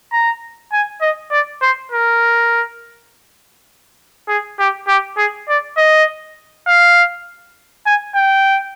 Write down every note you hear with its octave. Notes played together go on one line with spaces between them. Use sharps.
A#5
G#5
D#5
D5
C5
A#4
G#4
G4
G4
G#4
D5
D#5
F5
G#5
G5